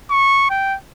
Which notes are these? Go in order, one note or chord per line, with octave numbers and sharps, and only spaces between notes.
C#6
G5